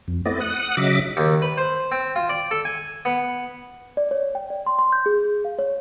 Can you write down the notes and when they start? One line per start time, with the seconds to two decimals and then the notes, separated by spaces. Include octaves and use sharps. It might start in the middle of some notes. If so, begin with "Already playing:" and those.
0.08 F2
0.26 A3 B3 C4 E4 D5 D#5
0.41 F#5 D#6 F#6
0.77 C#3 F#3 D#5 E5 D6
1.17 D#2
1.42 B4
1.58 C5
1.92 C4
2.16 F4
2.29 D5
2.51 A4
2.65 G#5
3.05 B3
3.97 D5
4.11 C#5
4.35 G5
4.50 D5
4.66 C6
4.79 C6
4.92 G6
5.06 G#4
5.45 F5
5.59 C#5